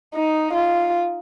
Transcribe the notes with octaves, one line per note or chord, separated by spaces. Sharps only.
D#4
F4